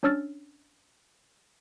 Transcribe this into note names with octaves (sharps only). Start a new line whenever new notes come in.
C#4 D4 C#5 E6 F6 A6